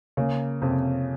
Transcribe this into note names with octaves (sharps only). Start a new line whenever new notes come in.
C#3 A#3
F2 C3